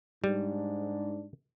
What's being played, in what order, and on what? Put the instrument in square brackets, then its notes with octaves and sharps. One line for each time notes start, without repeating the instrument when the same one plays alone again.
[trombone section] G#2 D4 [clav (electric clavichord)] G3